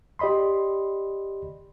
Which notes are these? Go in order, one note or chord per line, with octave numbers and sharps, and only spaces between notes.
G4 D5 D#5 B5 C6